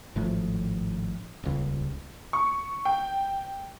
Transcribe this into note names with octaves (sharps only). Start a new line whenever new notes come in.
G#1 A2 F3
D#1 C#2
C#6
G5